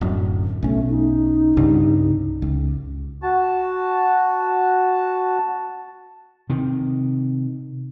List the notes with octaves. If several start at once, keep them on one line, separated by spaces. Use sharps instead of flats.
D1 F#2
B1 A3 C#4
D#4
C2 G2 C#3
C#2
F#4 A5
C3 D#3